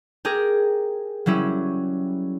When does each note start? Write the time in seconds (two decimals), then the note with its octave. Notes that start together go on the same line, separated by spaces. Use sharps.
0.25 G4 G#4 A#4
1.26 F#3 G3 C#4 E4